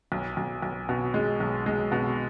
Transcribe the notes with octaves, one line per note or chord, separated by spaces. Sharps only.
B1
B1
B1
B2
G#3
B1
G#3
B2